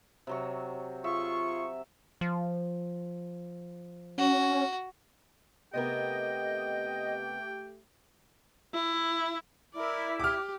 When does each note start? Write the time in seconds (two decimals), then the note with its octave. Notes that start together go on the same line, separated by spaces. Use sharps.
0.27 C3 F#3 C#6
1.04 F4 G#4 E5 C#6
2.21 F3
4.18 C#4 F#4
5.73 C3 A3 B3 G4 A#4 D#5 G5
8.74 E4
9.74 E4 A#4 D5
10.20 G4 D6 F6